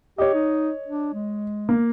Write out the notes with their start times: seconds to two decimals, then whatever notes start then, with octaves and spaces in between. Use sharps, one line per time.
0.18 G4 C#5 D#5
0.34 D#4
0.88 D4
1.14 G#3
1.69 A#3